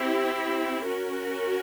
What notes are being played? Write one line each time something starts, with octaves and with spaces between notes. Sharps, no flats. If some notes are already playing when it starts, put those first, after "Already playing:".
Already playing: C4 E4 G4
C#4 F#4 A#4